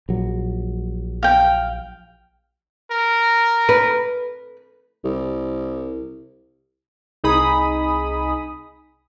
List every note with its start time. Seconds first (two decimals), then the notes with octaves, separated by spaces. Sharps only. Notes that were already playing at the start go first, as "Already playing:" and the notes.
0.09 A#1 F#3
1.23 F5 G5
2.91 A#4
3.69 B4
5.04 C2
7.24 C2 D#4 G#4 B5 D#6